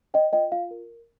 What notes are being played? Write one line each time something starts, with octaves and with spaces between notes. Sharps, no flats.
C#5 D#5 G5
F4 D#5 G5
F4 F5
A#4